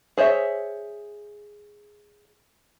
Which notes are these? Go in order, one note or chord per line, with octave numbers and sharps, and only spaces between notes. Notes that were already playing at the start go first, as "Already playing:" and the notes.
G#4 C5 C#5 E5